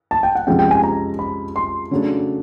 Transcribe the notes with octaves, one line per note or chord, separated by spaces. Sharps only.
A5
G5
F#5
F2 C3 F3 G#3 C#4 G5
G5
G#5
A#5
B5
C6
C#3 F#3 A3 D4